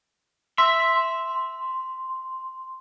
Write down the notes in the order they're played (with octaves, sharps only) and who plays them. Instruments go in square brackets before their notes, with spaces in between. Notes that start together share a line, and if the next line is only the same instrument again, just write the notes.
[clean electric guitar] E5 [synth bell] C6